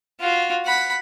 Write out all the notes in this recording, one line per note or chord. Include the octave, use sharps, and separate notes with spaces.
F4 F#4
F#5 B5